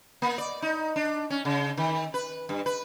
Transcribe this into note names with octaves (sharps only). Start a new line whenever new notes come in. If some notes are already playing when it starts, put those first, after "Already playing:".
A#3
D5
D#4
D4
C#4
C#3
D#3
B4
G2
B4